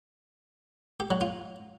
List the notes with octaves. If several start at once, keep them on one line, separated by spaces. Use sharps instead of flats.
G4
F#3
F4